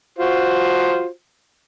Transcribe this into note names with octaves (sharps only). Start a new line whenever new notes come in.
F4 F#4 C5